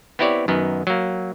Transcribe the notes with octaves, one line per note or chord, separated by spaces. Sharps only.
B3 C4 E4 G4 C#5 D5
F#2 D#3 B3
F#3 A#3